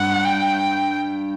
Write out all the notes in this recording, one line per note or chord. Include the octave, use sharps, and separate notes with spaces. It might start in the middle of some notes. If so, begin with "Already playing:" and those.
Already playing: G2 F#5
G5